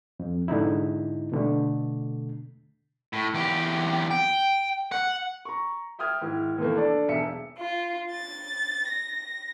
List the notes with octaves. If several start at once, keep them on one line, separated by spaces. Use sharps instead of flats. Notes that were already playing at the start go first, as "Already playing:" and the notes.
F2
G#2 D3 D#4 E4
B2 D3 A3
A2
E2 G4
G5
F#5
A#5 C#6
E5 G5 D#6 F6 G#6
G#2 D#3 E4
D#2 B2 E3 A3 A#3
D4 A4 D5
E1 B1 E5 C#7
F4
A6
A#6